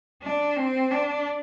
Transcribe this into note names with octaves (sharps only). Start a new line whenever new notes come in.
D4
C4
D4